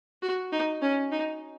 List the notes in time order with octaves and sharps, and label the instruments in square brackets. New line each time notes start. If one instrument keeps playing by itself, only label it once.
[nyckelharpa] F#4
D#4
C#4
D#4